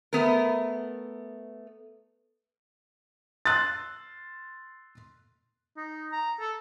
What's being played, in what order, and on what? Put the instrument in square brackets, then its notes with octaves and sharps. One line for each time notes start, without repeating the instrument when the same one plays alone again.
[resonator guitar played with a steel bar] A3 B3 A#4
[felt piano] C6 E6 F#6 A6
[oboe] D#4
A#5
A4